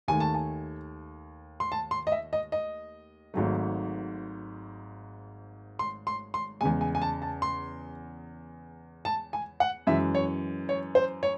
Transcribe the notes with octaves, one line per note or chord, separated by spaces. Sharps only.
D#2 D#3 A3 G#5
A5
G#5
C6
A5
C6
D#5
E5
D#5
D#5
G#1 G#2 F#3 A3
C6
C6
C6
E2 C#3 G#3 G#5
G#5
G#5
A5
A5
C6
A5
G#5
F#5
F#2 E3 G#3 E5
C#5
C#5
C5
C#5